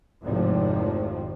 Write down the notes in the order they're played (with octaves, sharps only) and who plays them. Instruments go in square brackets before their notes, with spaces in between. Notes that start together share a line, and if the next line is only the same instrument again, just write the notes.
[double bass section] G#1 F2 A2 C3 D#3 F3